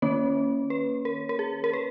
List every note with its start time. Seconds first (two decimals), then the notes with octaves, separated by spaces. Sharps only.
0.02 D#3 A#3 C#4 C#5
0.70 B4
1.05 A#4
1.29 A#4
1.39 G#4
1.64 A#4
1.73 B4